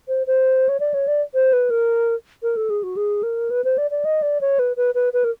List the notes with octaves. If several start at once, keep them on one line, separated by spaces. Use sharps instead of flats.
C5
C5
C#5
D5
C#5
D5
C5
B4
A#4
A#4
A4
G#4
F#4
G#4
A#4
B4
C5
D5
D5
D#5
D5
C#5
B4
B4
B4
B4
A#4